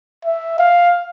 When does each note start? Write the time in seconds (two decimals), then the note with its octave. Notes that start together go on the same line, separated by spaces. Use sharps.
0.25 E5
0.59 F5